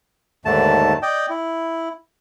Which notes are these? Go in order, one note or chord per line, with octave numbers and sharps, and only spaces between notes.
D#2 G#2 D3 A3 A5
D5 D#5 G5
E4